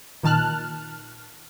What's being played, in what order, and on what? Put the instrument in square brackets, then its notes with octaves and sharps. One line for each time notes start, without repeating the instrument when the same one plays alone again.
[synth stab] A#2 D#3 A5 F6 F#6